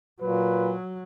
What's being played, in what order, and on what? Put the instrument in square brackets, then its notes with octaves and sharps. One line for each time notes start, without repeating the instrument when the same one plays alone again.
[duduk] A#2 [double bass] F#3 [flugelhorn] B4